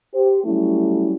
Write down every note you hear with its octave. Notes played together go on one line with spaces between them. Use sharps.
G4 C5
F#3 G3 A3 C#4 E4